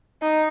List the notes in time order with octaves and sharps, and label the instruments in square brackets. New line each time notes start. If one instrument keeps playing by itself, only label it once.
[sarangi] D#4